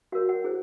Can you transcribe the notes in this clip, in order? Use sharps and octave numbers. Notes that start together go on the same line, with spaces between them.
F#4 A#4 C#5 F5
F#5
E4 G#4 C5